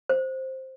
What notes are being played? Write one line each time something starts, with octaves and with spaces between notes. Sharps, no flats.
C5